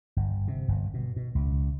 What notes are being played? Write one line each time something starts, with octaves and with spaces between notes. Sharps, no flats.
G1
C3
G1
B2
B2
C#2